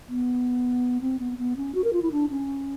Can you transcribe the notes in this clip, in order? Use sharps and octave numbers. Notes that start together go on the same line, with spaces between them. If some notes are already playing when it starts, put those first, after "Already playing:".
B3
C4
B3
B3
C#4
F#4
A#4
F4
E4
D4
C#4